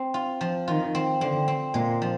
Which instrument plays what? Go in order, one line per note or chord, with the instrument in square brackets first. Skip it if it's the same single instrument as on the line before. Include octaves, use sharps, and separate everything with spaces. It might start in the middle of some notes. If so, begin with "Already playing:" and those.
Already playing: [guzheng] C4
F4
F3
[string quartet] D#3 [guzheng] F4
[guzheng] C4
[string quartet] D3 [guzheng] C4
[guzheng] C4
[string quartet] A#2 [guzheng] G#3
[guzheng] F3